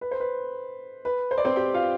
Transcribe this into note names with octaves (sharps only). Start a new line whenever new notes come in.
B4
C5
B4
B4
C5
D5
C4 C5
G4 G5
F4 F5